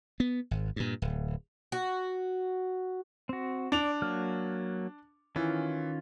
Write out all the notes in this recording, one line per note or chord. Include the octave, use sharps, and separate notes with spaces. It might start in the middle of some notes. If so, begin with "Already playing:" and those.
B3
G#1
G2 A#2
D1
F#4
C4 F#4
D4 D5 F7
F#3 A#3 F6
D#3 E3 C#4 F4